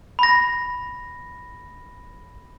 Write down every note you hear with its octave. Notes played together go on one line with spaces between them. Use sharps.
B5 A#6